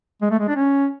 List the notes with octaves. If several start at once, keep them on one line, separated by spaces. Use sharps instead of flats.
G#3
A3
G#3
D4
C#4